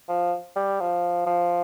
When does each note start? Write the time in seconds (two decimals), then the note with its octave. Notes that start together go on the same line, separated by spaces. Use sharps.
0.08 F3
0.56 G3
0.80 F3
1.26 F3